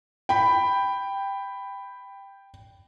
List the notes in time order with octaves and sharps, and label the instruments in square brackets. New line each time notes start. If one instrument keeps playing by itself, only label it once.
[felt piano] G5 B5